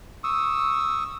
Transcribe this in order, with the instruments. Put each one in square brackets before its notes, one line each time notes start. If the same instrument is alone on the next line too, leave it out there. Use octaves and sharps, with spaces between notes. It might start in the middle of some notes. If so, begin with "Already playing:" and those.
[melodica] C#6 D#6 E6